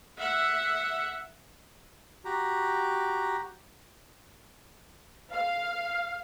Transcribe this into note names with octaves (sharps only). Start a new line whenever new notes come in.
E5 F#5
F#4 G4 A#5
F5